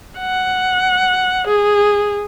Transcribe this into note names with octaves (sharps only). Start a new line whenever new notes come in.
F#5
G#4